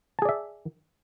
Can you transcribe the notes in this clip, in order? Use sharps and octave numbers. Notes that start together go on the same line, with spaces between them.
G#4 D5 E5 A5